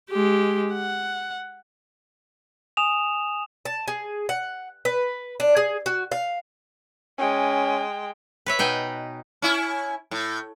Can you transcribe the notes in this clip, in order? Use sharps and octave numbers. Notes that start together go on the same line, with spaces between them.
G#3 G4
F#5
G#5 D#6 E7 F7
A5
G#4
F#5
B4
D4
G#4
F#4
F5
G#3 C#4 G5
B4 C#5 E5
B2 D#4 G5 G#5
C#4 E4
A2